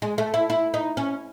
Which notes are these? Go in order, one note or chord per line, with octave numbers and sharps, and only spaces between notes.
G#3
A3
E4
E4
D#4
C#4